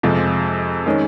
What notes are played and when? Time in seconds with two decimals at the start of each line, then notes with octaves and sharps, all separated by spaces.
0.03 F2 C3 F3 G#3
0.86 D#3 G#3 C#4